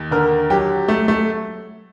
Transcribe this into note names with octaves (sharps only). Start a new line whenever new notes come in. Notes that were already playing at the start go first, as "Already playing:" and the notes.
Already playing: D#2
D3 A#4
F#3 G4
A3
A3